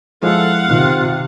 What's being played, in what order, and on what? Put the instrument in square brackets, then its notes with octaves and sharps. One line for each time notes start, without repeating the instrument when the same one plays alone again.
[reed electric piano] F3 G#3 E4 [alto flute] A4 [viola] F5 F#5
[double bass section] C3 [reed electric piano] D#3 [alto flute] F4